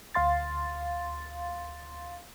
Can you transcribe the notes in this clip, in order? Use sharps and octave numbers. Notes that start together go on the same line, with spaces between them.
D2 F5 C6 A6